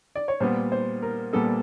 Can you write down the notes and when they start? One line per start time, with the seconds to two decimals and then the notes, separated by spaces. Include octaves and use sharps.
0.15 D5
0.28 C#5
0.40 A#2 G3 B3 C5
0.72 C5
1.02 A#4
1.33 A#2 G3 B3 A4